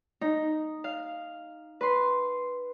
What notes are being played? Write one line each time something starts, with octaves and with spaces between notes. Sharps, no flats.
D#4
F5
B4 C6